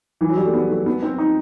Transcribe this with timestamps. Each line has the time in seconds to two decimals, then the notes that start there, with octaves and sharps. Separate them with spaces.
0.21 E3
0.29 F#3
0.37 G3
0.46 A3
0.53 B3
0.69 A3
0.86 B3
1.02 C4
1.18 D#4